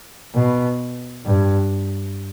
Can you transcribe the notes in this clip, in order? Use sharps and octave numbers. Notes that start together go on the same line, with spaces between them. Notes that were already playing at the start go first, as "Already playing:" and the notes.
B2
G2